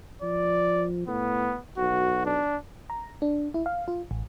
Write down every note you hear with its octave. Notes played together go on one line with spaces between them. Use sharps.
F3 D5
A2 B3
B1 F#4
D4
A#5
D4
E4
F5
F4
A1